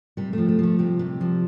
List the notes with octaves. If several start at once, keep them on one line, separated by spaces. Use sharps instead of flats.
C3 G3
F3 A3
A3
F3 A3
C3 G3
C3
F3